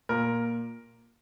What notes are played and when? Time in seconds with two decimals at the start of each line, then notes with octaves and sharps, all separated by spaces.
0.09 A#2 A#4